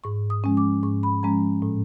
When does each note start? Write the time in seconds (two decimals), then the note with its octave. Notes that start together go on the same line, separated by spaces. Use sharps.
0.04 G#2 C#6
0.30 D#6
0.44 F3 G#3 C#4
0.57 D6
0.83 G#2 C#6
1.03 B5
1.23 F3 G#3 C#4 A#5
1.62 A2